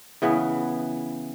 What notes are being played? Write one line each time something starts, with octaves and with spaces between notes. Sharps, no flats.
C#3 E3 B3